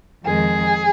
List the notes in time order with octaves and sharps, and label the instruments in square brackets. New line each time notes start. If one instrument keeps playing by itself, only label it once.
[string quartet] F2 D#3 G#3 G#4